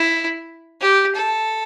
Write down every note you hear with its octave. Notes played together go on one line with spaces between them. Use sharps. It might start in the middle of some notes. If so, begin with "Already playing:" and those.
Already playing: E4
G4
A4